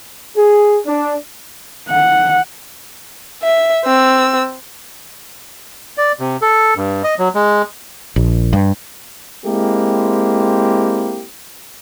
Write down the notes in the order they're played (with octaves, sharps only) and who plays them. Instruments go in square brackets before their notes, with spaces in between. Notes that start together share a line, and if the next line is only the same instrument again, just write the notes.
[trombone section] G#4
D4
[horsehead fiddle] F#5
[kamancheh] E5
C4 E6
[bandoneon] D5
C3
A4
G2
D#5
F#3
G#3
[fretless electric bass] A#1
G2
[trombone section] G#3 A#3 C4 E4 G4